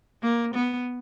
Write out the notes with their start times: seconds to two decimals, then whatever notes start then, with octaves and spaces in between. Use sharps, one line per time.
0.22 A#3
0.55 B3